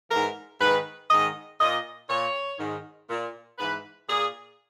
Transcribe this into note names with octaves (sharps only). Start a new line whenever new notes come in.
G#2 E3 A#4
G#2 D#3 B4
G#2 D#3 D#5
A#2 D#5
A#2 C#5
G#2 D#3
A#2
G#2 E3 B4
A#2 G#4